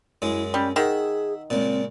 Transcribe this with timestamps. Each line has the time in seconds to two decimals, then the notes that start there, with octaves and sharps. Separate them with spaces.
0.22 F#2 G#3 E4
0.54 G3 C#4
0.76 D#3 G#4 E5 F#5
1.50 C#2 A#2 C4